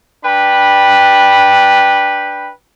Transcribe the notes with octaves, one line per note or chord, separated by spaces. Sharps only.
D4 B4 G5 B5